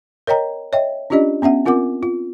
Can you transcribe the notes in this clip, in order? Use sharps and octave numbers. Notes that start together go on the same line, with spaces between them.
A#4 C#5 D#5 G5 A#5
C#5 D#5 E5 G5
C#4 D4 F4 G4 D5 D#5
B3 C#4 E5 F#5
C4 F4 A#4 F#5 D6
F4